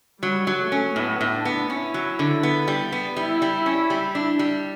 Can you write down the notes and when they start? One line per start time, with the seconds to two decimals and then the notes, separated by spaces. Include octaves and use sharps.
0.22 F#3 G3
0.47 F#3
0.60 A3
0.72 C#4
0.96 A2 B3
1.21 A2
1.33 D4
1.45 B3
1.70 C#4 E4
1.94 F#3
2.19 D3
2.43 B3
2.68 G3
2.92 B3
3.17 G3 E4
3.42 G3
3.66 C#4
3.90 G3
4.15 D4
4.39 G3